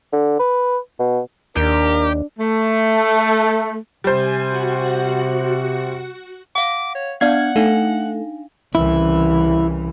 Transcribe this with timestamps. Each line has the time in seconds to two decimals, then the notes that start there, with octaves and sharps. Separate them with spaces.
0.12 D3
0.39 B4
0.99 B2
1.57 D#2 D4 G4 A#4
2.39 A3
4.04 C3 G3 C5 G#5
4.47 F#4 F#5
6.55 F5 F#5 D6
6.95 C#5
7.21 B3 D4 D5 F5 F#5 G#6
7.56 A3 D4 D#4 F5
8.75 C2 C#3 E3 E4